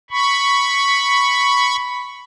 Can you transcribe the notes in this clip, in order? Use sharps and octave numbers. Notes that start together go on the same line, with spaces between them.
B5 C#6